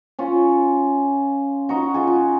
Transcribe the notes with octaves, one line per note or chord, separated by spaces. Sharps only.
C#4 F4
D#4 F#4
F4 G#4
D#4 F#4